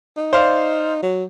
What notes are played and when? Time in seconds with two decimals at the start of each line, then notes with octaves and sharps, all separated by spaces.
0.17 D#4
0.33 C5 D5 F5
1.03 F#3